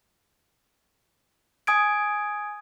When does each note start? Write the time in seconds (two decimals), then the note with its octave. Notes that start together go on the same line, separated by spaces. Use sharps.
1.67 G#5 D#6 G#6 D7